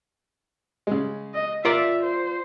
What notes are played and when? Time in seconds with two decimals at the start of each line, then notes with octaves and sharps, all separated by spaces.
0.87 C#3 G#3
1.34 D#5
1.65 F4 A#4 D5 E5
2.03 C5